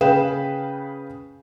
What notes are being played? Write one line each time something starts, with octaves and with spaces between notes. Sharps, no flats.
C#3 G#4 B4 F5 G5 E7